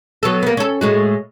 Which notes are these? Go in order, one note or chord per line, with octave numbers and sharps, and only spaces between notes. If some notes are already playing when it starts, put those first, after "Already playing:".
F#3 B3 A4
A#3 B3
C#4 A4
A2 G#3 F#4